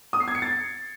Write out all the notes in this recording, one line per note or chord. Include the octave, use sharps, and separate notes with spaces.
D#6
C7
G#6
C#7
A6